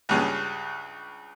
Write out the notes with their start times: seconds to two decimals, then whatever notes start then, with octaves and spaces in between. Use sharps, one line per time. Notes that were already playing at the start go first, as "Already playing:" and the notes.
0.09 C#2 G2 C#3